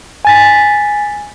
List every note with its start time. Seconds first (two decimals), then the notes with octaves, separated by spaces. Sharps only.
0.25 G#5 A6 B6